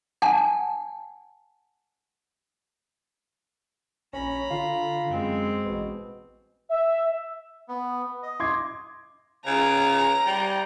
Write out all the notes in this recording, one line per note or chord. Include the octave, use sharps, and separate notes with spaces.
F#5 G#5 A5
A#1 C#4 A#5 B5
D3 F4
F#2 G#3 C4
A1 B2
E5
B3
D#5
C6 D6 G#6
C#3 A#5
G3